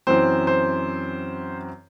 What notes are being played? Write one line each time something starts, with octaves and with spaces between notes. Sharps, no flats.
F#2 E3 C4 C5
C5